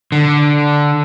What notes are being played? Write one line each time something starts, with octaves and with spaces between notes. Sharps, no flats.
D3